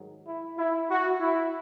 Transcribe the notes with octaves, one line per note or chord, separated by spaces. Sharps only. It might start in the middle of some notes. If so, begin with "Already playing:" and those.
Already playing: G#2 D#3 F#3
E4
E4
F#4
E4